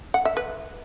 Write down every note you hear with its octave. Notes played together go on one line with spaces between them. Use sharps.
F#5
E5
B4